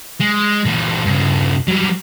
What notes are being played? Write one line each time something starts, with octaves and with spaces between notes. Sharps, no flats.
G#3
A#2 E3
G2 C#3
F#3 G3